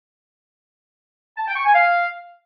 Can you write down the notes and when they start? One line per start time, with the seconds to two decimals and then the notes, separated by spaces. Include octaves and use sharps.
1.38 A5
1.47 G5
1.56 C#6
1.65 G#5
1.74 F5